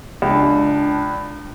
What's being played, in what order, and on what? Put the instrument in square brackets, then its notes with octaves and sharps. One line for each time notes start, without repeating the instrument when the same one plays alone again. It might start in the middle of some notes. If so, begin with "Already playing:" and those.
[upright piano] C#2 [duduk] D4